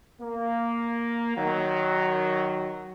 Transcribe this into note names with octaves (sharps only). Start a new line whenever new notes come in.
A#3
D#3 F#3